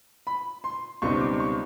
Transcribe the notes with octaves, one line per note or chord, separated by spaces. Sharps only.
B5
C6
C#2 B2 G3 C4 D#4 C#6
D6
C#6